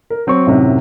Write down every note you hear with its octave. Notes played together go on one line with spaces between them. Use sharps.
A#4
F#3 C4 C#5 C#6
F#2 A2 C3 D#3 F#3